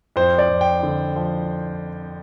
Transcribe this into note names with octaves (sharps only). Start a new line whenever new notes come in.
F2 C5
D5
F2
G5
D3
F3